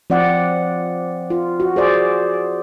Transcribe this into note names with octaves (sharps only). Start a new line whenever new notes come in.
F3 C4 D5 F#5
F4
F#4
G#4 C5 D5